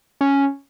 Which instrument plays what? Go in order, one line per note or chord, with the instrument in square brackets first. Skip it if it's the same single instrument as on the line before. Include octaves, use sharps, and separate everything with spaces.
[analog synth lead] C#4